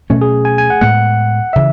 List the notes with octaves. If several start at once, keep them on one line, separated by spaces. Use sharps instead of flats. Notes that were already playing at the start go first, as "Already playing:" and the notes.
B2 F#3 A3 C#4
G#4
G#5
G#5
F#5
A2 G#3 B3 F#5
C#3 E3 E5